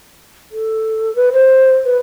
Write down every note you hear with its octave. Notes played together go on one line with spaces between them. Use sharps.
A4
B4
C5
B4